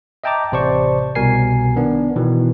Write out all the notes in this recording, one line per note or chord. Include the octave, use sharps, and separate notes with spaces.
D#5 E5 G5 A5 A#5 D6
A1 C3 C5 D5 A5 C#6
C2 B2 A#4 G#5 C7
D#3 B3 D4
B2 D#3 E3